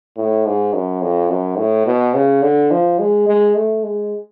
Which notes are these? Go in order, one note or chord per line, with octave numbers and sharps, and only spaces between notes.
A2
G#2
F#2
F2
F#2
A2
B2
C#3
D3
F3
G#3
G#3
A3
G#3